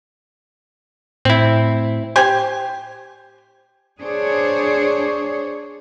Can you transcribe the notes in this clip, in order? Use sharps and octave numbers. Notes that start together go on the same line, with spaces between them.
A2 C4 E4
G4 C5 G#5
D4 G#4 C5 C#5